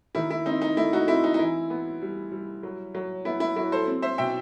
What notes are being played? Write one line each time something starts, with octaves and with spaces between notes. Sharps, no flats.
D#3 E4
E4
C4 D#4
D#4
A3 E4
D#4 F#4
C4 E4
D#4
D#4
E3 E4
B3
G3
G3
F#3
F#3
B3 E4
E4
F#3 E4
A4 C5
C4
C5 E5
B2 E5 G5